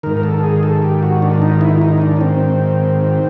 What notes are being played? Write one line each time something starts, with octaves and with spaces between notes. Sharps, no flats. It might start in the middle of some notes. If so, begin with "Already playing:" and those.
G#2 D#3 A#4
A#4
A4
G#4
A4
G4
F#4
D4
D#4
E4
E4
D#4
D#4
D4
C#4
C4